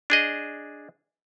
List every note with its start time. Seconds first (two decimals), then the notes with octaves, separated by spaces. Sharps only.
0.10 D4 G#4 D#5